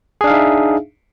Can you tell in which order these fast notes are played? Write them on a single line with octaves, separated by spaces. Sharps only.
G#4 D4 F5 D#4 E5